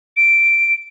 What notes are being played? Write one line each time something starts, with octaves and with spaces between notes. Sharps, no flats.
D7